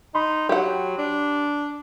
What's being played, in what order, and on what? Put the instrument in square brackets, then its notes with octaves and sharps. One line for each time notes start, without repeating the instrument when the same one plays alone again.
[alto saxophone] D#4 [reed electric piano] B5 C6
[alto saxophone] F#3 [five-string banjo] G4 F#5
[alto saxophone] D4